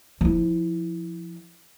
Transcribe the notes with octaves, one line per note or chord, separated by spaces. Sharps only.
F3 E4